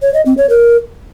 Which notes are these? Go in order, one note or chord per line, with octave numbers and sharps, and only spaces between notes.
C#5
D#5
C4
C#5
A#4